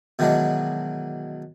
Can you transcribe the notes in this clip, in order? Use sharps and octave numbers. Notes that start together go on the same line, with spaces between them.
B2 D#3 E3 F#3 G#3 D4